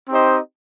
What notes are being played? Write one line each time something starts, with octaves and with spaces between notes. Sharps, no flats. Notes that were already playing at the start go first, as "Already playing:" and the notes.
C4 D#4 G4 C5 D#5